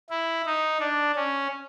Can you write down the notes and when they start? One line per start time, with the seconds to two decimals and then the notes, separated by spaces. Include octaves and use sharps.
0.10 E4
0.46 D#4
0.80 D4
1.16 C#4